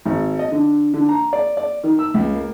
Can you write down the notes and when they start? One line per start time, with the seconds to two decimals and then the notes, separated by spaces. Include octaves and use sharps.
0.05 G#1
0.39 D#5
0.52 D3
0.94 D3
1.09 A#5
1.33 D5
1.57 D5
1.83 D#3
1.99 E6
2.14 C#2
2.35 A#3